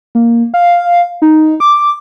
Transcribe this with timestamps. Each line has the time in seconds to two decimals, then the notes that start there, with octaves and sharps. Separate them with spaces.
0.15 A#3
0.54 F5
1.22 D#4
1.60 D6